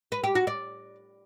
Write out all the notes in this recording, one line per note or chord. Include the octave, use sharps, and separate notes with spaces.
B4
G4
F#4
D5